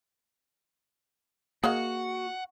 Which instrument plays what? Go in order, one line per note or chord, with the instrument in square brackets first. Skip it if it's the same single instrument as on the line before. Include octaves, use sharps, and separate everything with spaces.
[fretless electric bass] A#3 [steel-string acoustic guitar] F#4 [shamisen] G#4 D#5 F5 [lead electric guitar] F#5